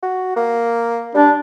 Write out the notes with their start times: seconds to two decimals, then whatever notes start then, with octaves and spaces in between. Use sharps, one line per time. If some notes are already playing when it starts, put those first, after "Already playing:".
0.03 F#4
0.36 A#3
1.15 G3 D4